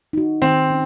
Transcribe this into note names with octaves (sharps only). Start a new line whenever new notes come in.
D#4 F#4
D#3 C4
C#4